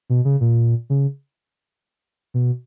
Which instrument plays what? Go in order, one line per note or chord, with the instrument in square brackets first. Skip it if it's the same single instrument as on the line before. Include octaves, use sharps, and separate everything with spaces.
[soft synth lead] B2
C#3
A#2
C#3
B2